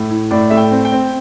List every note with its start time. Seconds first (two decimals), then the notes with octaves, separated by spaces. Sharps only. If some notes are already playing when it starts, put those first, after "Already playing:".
Already playing: A2
0.10 E4
0.31 A2 D5
0.50 A3 E5
0.57 G5
0.71 C4
0.85 G5
0.92 C4